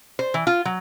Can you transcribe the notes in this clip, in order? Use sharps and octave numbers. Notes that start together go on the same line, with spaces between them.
C5
E3
F4
F#3